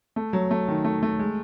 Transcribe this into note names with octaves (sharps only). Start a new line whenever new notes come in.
A3
F#3
A3
D#3
A3
A3
G#3